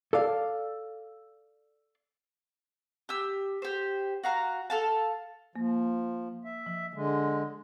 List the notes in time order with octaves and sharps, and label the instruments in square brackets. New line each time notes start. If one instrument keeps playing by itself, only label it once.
[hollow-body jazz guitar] A4 D5 F5
[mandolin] G4 E6
G4 C5
F#4 F5 A#5
A4 F5 A5
[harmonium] F3 [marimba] A#3
[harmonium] E5
[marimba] F3
[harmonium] D3 G#3